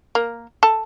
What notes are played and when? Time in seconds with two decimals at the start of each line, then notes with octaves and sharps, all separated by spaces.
0.15 A#3
0.63 A4